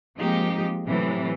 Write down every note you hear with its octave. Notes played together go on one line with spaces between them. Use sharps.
F3 G#3 A#3 C4 D#4 G4
A2 C3 E3 F#3